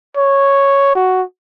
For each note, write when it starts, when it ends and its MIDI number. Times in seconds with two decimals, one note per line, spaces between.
0.17 0.94 73
0.95 1.23 66